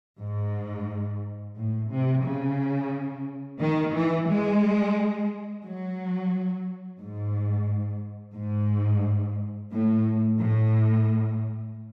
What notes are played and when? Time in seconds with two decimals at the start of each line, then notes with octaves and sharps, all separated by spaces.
0.21 G#2
1.57 A2
1.91 C3
2.24 C#3
3.61 D#3
3.95 E3
4.29 G#3
5.64 F#3
7.00 G#2
8.36 G#2
9.72 A2
10.40 A2